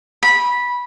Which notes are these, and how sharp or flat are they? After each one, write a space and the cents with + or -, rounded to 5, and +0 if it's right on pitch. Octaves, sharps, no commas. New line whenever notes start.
B5 -15